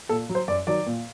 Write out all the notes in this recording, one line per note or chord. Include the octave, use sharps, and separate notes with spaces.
A#2 A4
F#3
C5
F#2 D5
D#3 F#3 D5
A#2